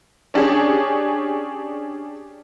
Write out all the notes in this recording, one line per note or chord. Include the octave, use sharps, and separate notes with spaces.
C#4 D4 G4 G#4 C#5